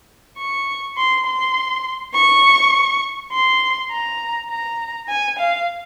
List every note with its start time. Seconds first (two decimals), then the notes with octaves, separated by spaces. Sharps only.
0.38 C#6
0.97 C6
1.26 C6
2.14 C#6
3.33 C6
3.92 A#5
4.50 A#5
5.08 G#5
5.39 F5